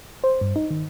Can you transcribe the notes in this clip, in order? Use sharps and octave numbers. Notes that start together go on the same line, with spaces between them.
C5
G2
D#4
D#3